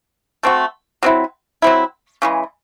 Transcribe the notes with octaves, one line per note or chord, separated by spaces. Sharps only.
A3 C4 F#4
F#3 C4 E4
F#3 C4 E4
C#3 E3 G#3